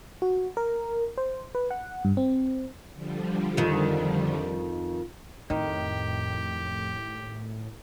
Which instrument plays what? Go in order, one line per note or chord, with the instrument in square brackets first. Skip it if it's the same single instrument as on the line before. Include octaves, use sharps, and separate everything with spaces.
[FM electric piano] F#4
A#4
C5
B4
F#5
G2
C4
[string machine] D3 F3 G3
[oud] F2 D#3
[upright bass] F2 [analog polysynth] A2 [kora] D#3 [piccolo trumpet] G4